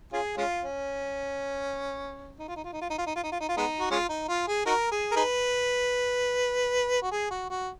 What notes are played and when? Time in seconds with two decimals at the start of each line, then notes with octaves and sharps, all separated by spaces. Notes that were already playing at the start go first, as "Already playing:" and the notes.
0.13 C#4 F4 G#4
0.37 G#3 C#4 F4
0.63 C#4
2.39 D#4
2.48 F4
2.56 D#4
2.64 F4
2.73 D#4
2.81 F4
2.90 D#4
2.98 F4
3.07 D#4
3.16 F4
3.23 D#4
3.32 F4
3.41 D#4
3.49 F4
3.57 G#3 B3 D#4
3.79 F#4
3.91 G#3 C#4 F4
4.09 D#4
4.29 F4
4.48 G#4
4.66 D#4 F#4 A#4
4.91 G#4
5.11 A#4
5.16 D#4 G#4 B4
7.02 F#4
7.12 G#4
7.31 F#4
7.50 F#4